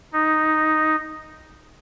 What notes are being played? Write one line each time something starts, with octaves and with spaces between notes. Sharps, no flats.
D#4